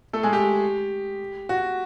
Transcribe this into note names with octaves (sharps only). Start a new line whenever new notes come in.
A3 A4
G#3 G#4
G4
F#4